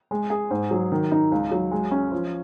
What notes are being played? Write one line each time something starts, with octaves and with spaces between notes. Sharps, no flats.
G#3
G#4
G#2
F#3
D#3
D#4
C#2
F#3
G#3
C#4
F3